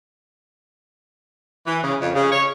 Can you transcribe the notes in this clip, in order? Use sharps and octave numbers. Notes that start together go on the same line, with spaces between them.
E3
C#3
F2
C#3
C#5